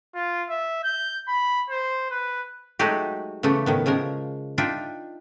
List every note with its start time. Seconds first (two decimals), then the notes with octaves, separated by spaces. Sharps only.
0.15 F4
0.50 E5
0.84 G6
1.28 B5
1.70 C5
2.10 B4
2.79 F#3 G#3 A3 D#4 F#4 G4
3.43 C#3 E3 A3 B3
3.66 A2 D#3 B3
3.86 C#3 F3 G#3 A#4
4.58 D4 D#4 F4 E5 G5